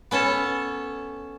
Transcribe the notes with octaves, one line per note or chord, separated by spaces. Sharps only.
B3 C#4 A4 A5